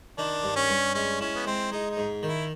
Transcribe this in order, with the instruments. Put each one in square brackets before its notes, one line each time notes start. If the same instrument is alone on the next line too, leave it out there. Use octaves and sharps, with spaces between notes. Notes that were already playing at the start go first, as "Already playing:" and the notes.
[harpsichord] D#3 [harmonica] D4
[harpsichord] G2
[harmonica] C#4
[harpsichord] G2
[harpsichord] G#3 [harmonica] C#4
[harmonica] C#4 [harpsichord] E4
[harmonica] B3
[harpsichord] G#3 [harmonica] C4
[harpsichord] G#3 [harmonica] D#4
[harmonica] D#4
[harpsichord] G#2
D#3
[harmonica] E4